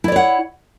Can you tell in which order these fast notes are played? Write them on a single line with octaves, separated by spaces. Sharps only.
E4 D5 C#5 F#5